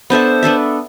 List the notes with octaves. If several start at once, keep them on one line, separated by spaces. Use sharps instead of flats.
B3 D4 A4 C5 E5
B3 D4 A4 E5